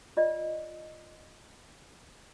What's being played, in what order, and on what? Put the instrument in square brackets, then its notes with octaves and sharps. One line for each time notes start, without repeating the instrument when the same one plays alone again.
[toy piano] F4 D5 D#5